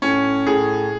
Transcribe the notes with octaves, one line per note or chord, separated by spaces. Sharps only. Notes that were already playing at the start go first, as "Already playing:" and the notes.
A2 C#4
A2 G#4